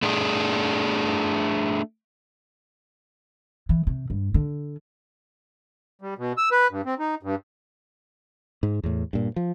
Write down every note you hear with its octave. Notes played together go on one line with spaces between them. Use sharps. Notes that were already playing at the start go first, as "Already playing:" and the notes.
A3 D4 G#4
E3
C3
G2
D3
G3
B2
E6
B4
G2
C4
D#4
G2
G#2
E2 A2
G2 A#2
F3